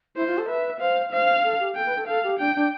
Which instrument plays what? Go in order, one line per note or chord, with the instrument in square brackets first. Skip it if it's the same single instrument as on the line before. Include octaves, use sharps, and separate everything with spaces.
[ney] E4 [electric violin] C5
[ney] F4
A4
[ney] B4 [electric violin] E5
[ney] C5 [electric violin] F5
[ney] C5 [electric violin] F5
[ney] A4
G4
[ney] A4 [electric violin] G5
[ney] B4
A4
[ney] A4 [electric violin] F5
[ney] G4
[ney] D4 [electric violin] G5
[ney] D4